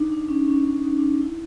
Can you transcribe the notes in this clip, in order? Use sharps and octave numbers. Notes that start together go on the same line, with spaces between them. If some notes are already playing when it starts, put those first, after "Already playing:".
Already playing: D4 D#4
D4
C#4
C#4
D4
D#4
D4
D#4
E4